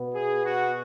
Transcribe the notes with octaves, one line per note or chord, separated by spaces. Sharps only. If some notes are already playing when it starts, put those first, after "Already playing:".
Already playing: B2 B3
G#4
F#4